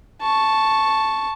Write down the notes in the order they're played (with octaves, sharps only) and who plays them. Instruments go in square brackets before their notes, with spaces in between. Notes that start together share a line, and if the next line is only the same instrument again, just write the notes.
[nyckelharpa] A5 C#6